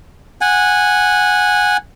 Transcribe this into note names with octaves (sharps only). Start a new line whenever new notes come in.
F#5 G#5